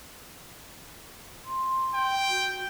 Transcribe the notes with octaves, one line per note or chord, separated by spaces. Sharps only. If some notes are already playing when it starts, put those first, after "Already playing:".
C6
G5
F#4